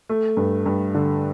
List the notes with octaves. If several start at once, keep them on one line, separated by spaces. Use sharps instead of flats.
A3
G2
G2
D3